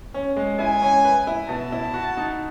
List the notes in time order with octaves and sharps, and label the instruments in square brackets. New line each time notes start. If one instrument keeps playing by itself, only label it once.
[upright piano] C#4
G#3
[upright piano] E4 [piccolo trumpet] G#5
[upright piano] C#4
B4
E4
[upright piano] B2 [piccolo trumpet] A5
[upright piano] E4
F#4
D#4